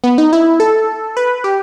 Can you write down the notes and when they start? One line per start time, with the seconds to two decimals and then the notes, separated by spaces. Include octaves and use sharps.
0.04 B3
0.18 D#4
0.33 E4
0.60 A4
1.17 B4
1.44 G4